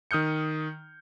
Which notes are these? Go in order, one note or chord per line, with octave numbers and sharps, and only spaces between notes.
D#3 D#6 F6 G6 C#7